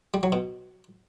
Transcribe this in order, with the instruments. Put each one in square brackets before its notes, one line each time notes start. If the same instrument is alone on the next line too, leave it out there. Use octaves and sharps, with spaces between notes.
[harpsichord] G3
F#3
B2